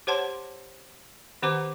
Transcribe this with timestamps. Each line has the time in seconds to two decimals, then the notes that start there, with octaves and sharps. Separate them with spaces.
0.07 G4 C5 C#5 F#5 A5 C6
1.42 D#3 C4 G4 C5 A#5 D6